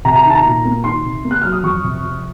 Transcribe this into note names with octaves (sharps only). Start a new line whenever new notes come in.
C3 A#5
A#5
D#3 A5
A#5
A#2
A#3
D#3 C6
C3
A#3
F#6
F#3 F6
D#6
F2 C#6
C3
F3